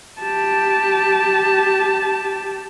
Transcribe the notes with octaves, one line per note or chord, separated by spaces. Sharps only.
G4 A5